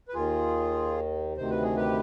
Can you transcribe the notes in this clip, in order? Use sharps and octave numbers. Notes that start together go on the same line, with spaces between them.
B4
D#2 D#3 F4 G#4
D2 C3 D#3 C5
B4
G#4
G4 B4